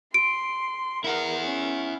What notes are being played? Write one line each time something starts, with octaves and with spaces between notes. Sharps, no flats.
C6 D7
E4 A#4 F#5
C#4